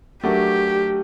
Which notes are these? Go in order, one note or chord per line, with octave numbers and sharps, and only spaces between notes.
F#3 A3 D4 F#4 G4 A#4